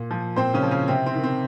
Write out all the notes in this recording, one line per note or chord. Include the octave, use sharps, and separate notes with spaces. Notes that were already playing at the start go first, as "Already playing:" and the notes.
Already playing: A#2
F3
A#2 C4 C5
C#3 C#4
F3
C#3 C#4
C3 C4
C4
D#3
C4